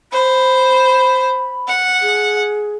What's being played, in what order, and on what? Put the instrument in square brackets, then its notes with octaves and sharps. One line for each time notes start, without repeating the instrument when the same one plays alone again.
[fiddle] C5 [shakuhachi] B5
[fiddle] F#5
[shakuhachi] G#4